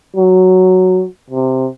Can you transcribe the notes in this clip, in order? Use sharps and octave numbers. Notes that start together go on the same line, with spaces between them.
F#3
C3